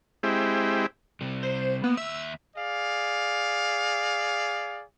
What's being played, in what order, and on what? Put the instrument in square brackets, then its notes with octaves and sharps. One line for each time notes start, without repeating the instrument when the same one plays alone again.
[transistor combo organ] G#3 C4 E4 G4
[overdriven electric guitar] C3 G3
[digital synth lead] C5
[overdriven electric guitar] A#3 [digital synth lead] B3
[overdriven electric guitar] D#2 E5 [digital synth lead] E6
[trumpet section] G#4 D5 F5